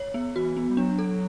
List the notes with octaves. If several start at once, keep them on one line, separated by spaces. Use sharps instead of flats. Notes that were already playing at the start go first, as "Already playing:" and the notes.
Already playing: C#5
B3
E3 F#4
B3
G3
F#3 D4
A4